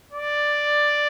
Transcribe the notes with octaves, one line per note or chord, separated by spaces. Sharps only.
D5